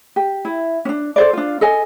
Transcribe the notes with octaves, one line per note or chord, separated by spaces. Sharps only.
G4
E4
C#4 D4
A4 C5 D5
D4 F4
A4 D#5 G#5